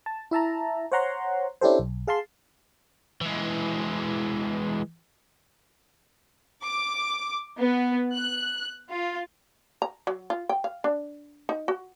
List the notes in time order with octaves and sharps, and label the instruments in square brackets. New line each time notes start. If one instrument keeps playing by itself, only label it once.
[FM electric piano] A5
E4 E5 A5 A#5
C5 C#5 F#5 A#5 C6
C#4 D4 E4 G4 A4 C5
B1
G#4 F5 A5 C6
[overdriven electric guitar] E3 G#3
[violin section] D6
B3
F#6
F4
[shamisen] A#5
F#3
F4
G5
F5
D4
D#4
F#4